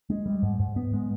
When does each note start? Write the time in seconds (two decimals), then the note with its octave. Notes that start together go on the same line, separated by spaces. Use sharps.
0.10 G#3
0.26 G3
0.43 G#2
0.60 G#2
0.76 B3
0.93 G#3